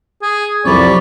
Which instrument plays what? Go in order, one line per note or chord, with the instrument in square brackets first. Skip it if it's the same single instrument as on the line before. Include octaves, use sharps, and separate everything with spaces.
[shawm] G#4
[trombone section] C2 F2 [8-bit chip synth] F#3 C4 [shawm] D5 [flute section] B5 C#6